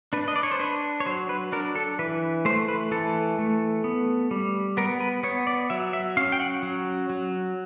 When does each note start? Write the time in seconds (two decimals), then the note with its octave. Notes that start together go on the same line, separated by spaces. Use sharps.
0.13 D4 B4
0.28 D#5
0.36 D5
0.43 C#5
0.51 C5
0.59 D4 B4
1.00 C#5
1.06 F#3 C5
1.29 B4
1.52 D4 A#4
1.75 A4
1.99 E3 B4
2.45 A3 C5
2.68 B4
2.91 E3 A4
3.39 A3
3.84 B3
4.31 G3
4.77 B3 A#4
5.00 B4
5.23 B3 C#5
5.47 D5
5.70 F#3 E5
5.93 E5
6.17 C#4 F5
6.32 G5
6.40 F#5
6.63 F#3
7.10 F#3